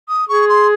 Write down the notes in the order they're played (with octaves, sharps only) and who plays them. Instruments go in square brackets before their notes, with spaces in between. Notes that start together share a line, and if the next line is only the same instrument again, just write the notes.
[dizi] D#6
[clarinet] G#4 [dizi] C#6
[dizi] C6